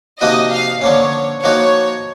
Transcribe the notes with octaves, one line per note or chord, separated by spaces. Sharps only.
C3 F3 A#3 D#4 F#4 D#5
F5
D3 F3 A#3 C#4 C#5
F3 A#3 D#4 F#4 C#5